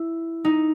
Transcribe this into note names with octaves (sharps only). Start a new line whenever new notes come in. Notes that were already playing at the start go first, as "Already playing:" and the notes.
Already playing: E4
D#4